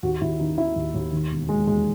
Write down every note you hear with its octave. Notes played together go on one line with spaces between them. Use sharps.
D#2 F#4
D#2 E4
D#3 D#4
D#3 E4
D#2
D#2
D#3
E1
E1 G#3
E2 G#3